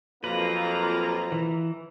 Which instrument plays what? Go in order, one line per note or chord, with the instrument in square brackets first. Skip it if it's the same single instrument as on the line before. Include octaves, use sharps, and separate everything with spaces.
[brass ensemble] F2 A#3 [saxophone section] F#3 F4 [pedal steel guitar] B4 [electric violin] A#5
[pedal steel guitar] E3